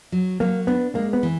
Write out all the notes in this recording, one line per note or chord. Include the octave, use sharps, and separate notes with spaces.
F#3
F#3 A#3
B3 D4
G#3 A#3
B3
E3